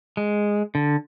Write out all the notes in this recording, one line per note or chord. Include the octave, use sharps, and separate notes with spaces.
G#3
D3